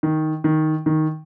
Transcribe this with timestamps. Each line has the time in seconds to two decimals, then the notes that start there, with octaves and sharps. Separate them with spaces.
0.03 D#3
0.44 D#3
0.86 D#3